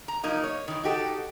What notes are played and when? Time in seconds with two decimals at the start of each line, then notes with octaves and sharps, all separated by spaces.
0.08 A#5
0.24 F3 F#3 A#3 D#4
0.44 C#5
0.68 D#3 E3
0.83 D#4 F#4 G4 A4